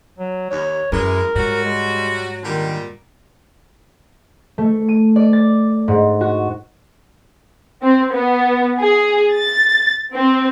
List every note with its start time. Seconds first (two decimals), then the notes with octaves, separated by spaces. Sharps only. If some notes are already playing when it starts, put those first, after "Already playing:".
0.18 F#3
0.50 D#2 C#5
0.92 F#2 E3 G#3 A#4
1.35 G#2 F#3 G3 F#4
1.64 G#3
2.44 A#2 D3 D#3 G3
4.58 A3
4.88 D#7
5.16 D5
5.33 A6
5.88 G#2
6.21 F#4
7.82 C4
8.13 B3
8.80 G#4
9.33 A6
10.13 C4